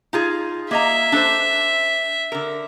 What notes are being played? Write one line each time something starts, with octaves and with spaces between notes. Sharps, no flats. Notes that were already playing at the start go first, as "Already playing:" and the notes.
D#4 F4 G#4
A#3 D#5 E5 A#5
D4 A4 C5
D3 A#4